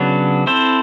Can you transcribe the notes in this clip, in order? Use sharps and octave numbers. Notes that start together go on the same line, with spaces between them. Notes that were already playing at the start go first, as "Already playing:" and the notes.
Already playing: C#3 F#3 B3 D4
C4 E4 A4 C5